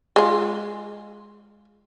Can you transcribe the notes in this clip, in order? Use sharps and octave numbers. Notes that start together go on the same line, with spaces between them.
G#3 F4